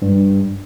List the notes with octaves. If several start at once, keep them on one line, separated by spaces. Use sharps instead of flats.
G2